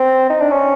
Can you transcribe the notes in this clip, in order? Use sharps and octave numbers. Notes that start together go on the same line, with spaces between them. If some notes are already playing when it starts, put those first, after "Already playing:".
Already playing: C4
D#4
D4
C#4